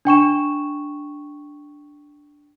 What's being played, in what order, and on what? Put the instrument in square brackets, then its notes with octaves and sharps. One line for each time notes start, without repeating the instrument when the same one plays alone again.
[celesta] D4 G5 C#6 E7